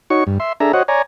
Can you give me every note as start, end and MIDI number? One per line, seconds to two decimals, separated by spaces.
0.10 0.24 63
0.10 0.24 66
0.10 0.24 73
0.10 0.24 85
0.27 0.38 43
0.40 0.53 76
0.40 0.53 84
0.60 0.72 62
0.60 0.72 68
0.60 0.72 69
0.60 0.72 76
0.60 0.72 82
0.73 0.83 66
0.73 0.83 72
0.73 0.83 73
0.73 0.83 75
0.73 0.83 78
0.88 1.02 73
0.88 1.02 74
0.88 1.02 80
0.88 1.02 82